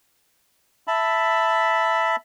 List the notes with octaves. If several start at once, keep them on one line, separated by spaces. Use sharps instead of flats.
E5 A5 B5